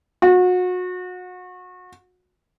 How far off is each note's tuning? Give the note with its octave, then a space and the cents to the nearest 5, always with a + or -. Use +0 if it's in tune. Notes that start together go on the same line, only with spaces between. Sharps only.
F#4 -30